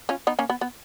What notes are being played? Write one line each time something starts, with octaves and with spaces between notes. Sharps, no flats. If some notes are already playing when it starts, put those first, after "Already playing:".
C#4 F4
B3 D#4
A#3 C#4
B3
B3